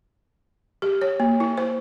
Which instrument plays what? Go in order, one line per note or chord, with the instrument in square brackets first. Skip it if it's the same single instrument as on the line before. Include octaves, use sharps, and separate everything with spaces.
[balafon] G4
C#5
A#3
E4
C5